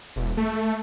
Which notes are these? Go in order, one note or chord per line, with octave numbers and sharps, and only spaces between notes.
E1
A3